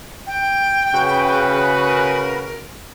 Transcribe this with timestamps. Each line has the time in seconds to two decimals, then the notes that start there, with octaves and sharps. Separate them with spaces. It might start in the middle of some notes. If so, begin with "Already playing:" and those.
0.26 G5
0.95 C#3 F#4 B4
1.84 A#4